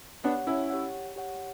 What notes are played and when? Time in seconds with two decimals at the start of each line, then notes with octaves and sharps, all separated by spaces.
0.24 B3 D4 G4 C#5 F#5
0.47 C#4 E4
0.70 G4 C#5 F#5
1.16 G4 C#5 F#5